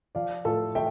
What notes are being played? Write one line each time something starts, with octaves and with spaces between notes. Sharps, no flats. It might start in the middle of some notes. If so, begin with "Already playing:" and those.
F3 D5 F5
A2 F4 A4
A3 E5 G5